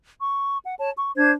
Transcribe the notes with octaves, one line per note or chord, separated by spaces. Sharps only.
C#6
F#5
C#5 A5
C#6
D4 C5 G#6